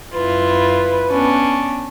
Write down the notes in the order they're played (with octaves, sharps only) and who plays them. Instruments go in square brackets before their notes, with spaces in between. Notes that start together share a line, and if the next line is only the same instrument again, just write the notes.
[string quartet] F#2 E4 F4 [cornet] B4
[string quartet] B3 C#4 D4